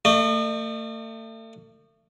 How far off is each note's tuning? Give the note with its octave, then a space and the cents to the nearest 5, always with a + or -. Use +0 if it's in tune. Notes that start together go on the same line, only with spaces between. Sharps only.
A3 +40 D#5 -40